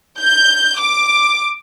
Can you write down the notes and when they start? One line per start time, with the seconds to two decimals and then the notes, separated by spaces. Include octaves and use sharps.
0.19 G6
0.79 D6